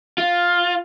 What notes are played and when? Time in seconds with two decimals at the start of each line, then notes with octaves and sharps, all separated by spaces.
0.18 F4